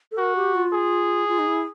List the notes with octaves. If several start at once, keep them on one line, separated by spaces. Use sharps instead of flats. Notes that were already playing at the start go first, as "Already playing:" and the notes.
A4
F#4 A#4
G4
F4
G#4
F4
D#4
E4